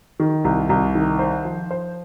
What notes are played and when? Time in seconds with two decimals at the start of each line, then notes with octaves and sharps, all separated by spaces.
0.20 D#3
0.45 C2
0.69 C2
0.95 D#3
1.19 C5
1.45 F3
1.71 C5